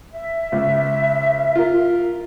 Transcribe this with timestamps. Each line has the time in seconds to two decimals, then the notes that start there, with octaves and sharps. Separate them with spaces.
0.11 E5
0.52 C#2
1.55 F4 A#4